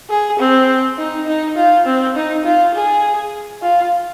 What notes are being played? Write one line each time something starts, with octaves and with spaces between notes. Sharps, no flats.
G#4
C4
D#4
D#4
F4
C4
D#4
F4
G#4
F4